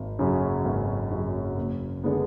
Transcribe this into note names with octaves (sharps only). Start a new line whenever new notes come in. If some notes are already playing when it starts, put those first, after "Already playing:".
Already playing: G#1
F#2 C#3 F#3
G#1
F#2 C#3 F#3
F#1
D3 G#3 B3